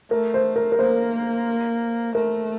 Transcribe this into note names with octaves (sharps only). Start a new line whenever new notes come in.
A3 A#4
C5
A#4
A#4
A#3 C5
A3 A#4